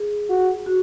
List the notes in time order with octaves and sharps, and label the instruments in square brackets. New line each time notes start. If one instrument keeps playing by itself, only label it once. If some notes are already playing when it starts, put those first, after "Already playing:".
Already playing: [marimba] G#4
[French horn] F#4
[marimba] F#4